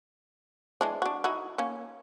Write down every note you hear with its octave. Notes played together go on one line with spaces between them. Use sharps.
E3 G#3 D4
D4 F#4
D#4 E4 F#4
A#3 C#4